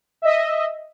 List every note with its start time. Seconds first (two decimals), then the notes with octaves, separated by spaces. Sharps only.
0.22 D#5 E5